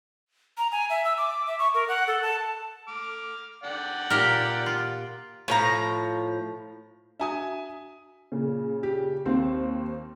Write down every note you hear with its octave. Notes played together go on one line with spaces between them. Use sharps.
A#5
G#5
E5
E6
D6
E5
C#6
A#4
F#5
A4
A5
D6 F6
D5 F#5 G5
A#2 G4 A#4
F4
A2 F3 A#5
D4 F#4 E5 G#5 D#6
A#2 C#3
G4
D#2 C4 C5 F5